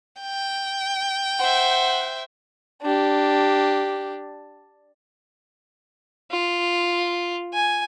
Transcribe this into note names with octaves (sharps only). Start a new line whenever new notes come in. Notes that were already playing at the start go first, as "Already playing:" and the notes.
G5
C5 E5 F#5
D4 G4
F4
G#5